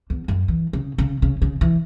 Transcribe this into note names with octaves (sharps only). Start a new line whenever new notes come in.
E2
F#2
E3
C#3
C#3
C#3
C#3
E3